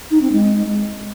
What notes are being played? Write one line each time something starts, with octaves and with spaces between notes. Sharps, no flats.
D#4
C4
G#3